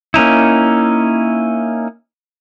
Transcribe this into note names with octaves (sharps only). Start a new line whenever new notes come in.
A#3 C#4 D#4 E4